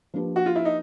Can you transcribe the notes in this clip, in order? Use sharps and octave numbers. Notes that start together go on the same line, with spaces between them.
F3 A#3 D4 G4 B4
F#4
F4
E4
D#4